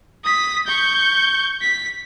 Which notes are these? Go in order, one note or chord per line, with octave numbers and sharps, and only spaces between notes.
D#6 B6
C#6 G6
B6